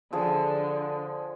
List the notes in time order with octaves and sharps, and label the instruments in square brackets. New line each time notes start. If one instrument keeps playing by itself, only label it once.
[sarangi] D3 [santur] F3 G#4